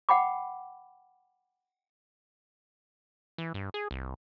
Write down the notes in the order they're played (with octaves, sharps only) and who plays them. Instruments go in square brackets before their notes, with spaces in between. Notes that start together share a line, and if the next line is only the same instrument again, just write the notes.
[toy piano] F#5 G5 B5 D6
[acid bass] E3
G2
G#4
C2